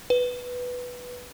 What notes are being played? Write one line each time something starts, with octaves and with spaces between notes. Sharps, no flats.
B4